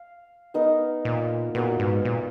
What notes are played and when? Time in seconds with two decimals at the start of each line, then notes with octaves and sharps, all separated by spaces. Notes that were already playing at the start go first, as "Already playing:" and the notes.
Already playing: F5
0.54 B3 D#4 A#4 D#5
1.05 A#2
1.55 A#2 B3 F#4 A#4
1.80 G#2
2.05 A#2